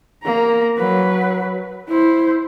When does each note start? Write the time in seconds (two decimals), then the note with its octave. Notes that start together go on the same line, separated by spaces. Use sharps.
0.24 A#3 A#5
0.78 F#3 B4
1.89 E4 C5